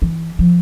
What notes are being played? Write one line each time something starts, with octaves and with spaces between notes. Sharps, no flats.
E3
F3